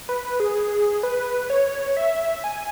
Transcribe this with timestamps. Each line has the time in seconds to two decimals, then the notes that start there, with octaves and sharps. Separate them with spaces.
0.09 B4
0.25 B4
0.40 G#4
1.03 B4
1.50 C#5
1.97 E5
2.44 G#5